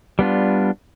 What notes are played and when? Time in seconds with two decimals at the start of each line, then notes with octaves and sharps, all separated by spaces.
0.19 G3 B3 D4 F4